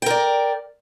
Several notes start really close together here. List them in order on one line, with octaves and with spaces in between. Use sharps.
G5 A#4 D5